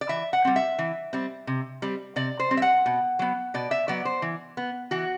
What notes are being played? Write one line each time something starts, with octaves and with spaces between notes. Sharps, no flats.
D5
E3 E5
F#5
G3 C4
E5
E3
G3 C4
C3
G3 C4
C3 D5
C5
G3 C4
E5
F#5
B2
F#3 B3
B2 D5
E5
F#3 B3 D5
C5
E3
B3
E3 F#4